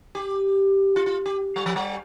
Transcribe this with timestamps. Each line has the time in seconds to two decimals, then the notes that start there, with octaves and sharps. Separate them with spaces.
0.15 G4
0.96 F4
1.06 F4
1.26 G4
1.56 G3
1.66 F3
1.76 G3